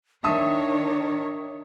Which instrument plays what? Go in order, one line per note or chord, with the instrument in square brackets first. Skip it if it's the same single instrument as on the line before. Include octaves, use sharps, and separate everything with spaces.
[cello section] D#3 C#5 [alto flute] D4 [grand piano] E5 A5 D#6